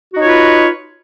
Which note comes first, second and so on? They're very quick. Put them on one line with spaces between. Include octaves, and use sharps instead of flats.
F#4 D#4 C#5 F4 B4